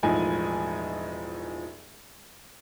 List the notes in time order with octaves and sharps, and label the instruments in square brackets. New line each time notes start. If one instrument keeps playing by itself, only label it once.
[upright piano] E1 A2 F3 D#4 G#5